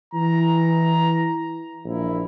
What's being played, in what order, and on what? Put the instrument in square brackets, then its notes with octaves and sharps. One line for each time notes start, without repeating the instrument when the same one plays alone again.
[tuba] E3 [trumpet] A#5
[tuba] A#1 [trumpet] E4